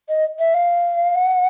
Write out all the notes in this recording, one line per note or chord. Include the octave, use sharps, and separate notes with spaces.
D#5
E5
F5
F#5